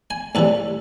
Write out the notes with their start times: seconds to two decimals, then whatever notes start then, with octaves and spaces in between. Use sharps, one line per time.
0.10 G#5
0.35 A2 E3 G3 A5